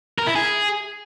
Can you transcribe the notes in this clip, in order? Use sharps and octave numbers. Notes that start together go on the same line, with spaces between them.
A#4
E4
G#4